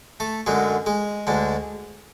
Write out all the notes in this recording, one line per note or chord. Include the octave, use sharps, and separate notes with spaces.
A3 A4
F#2 D3 F#3 G#3 G#4
G#3 G#4
D2 D3 G#3 D4